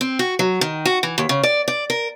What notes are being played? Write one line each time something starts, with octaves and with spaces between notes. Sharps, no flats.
C4
F#4
F#3
D#3
F#4
E3
D#2
C#3
D5
D5
A#4